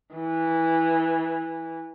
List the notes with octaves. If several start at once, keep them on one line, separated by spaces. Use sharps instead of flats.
E3